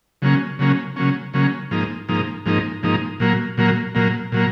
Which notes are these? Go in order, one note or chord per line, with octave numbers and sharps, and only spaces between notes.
C#3 F#3 A#3 C#4
C#3 F#3 A#3 C#4
C#3 F#3 A#3 C#4
C#3 F#3 A#3 C#4
G#2 F3 A#3 D#4
G#2 F3 A#3 D#4
G#2 F3 A#3 D#4
G#2 F3 A#3 D#4
A#2 F#3 A#3
A#2 F#3 A#3
A#2 F#3 A#3
A#2 F#3 A#3